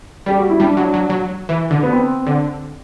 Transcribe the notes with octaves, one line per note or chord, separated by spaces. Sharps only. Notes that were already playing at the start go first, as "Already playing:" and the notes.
G3 G4
F#4
E4
G3 D4
F#3
F#3
F#3
E3
D3
B3
C4
D3